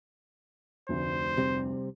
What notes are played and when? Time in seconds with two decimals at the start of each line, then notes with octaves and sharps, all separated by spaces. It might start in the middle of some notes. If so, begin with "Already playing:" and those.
0.89 F1 D2 C5
1.37 C3 G3 C4